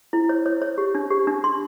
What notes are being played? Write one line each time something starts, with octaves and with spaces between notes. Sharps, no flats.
E4
C#5
C#5
C#5
G4
D4
G4
D4
C6